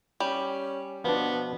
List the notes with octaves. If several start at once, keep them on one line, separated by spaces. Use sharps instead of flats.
G3 C#4
B2 F3 B3 D4